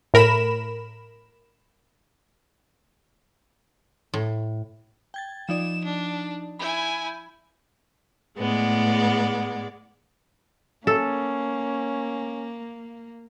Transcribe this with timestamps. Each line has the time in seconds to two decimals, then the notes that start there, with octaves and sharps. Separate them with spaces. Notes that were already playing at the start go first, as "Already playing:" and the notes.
0.14 A2 A#4 B5 E7
4.14 A2
5.14 G5 G#6 A6
5.49 F3 D#4 D5 E7
5.85 D4
6.59 E4 G#5 B5 G6
8.36 A2 G#3 B3 D5
10.87 A#3 C#4 A4